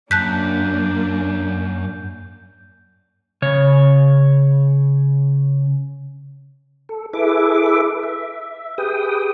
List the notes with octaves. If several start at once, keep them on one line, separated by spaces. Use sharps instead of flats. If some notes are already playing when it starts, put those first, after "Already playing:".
F#2 A#3 D4 A5 F#6 G6 B6
C#3 C#5
A4
E4 G#4 A4 B4 E5 D6
E5
G4 G#4 B4 G5 D#6